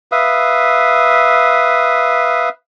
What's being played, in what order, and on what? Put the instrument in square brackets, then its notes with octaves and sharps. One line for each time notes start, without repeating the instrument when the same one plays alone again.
[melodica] B4 E5 F5 D#6